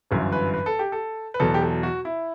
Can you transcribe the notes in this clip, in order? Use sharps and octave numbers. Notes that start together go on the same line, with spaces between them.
G1 F#2 E3
B4
B4
A4
G4
A4
B4
E2 B2 F#3 A4
G4
A4
F#4
E4